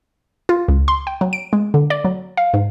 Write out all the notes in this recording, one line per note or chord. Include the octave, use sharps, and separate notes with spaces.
F4
C#2
C6
G5
F#3
D7
G#3
D3
D5
F#3
F5
G#2